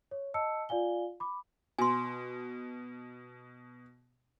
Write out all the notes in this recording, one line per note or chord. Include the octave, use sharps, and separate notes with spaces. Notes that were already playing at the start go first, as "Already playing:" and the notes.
C#5
D#5 A5 E6 C#7
F4 D5 F5 G#5 G7
B5 D6
B2 G#5 C6